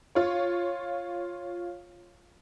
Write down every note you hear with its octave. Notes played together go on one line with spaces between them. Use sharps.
F4 C#5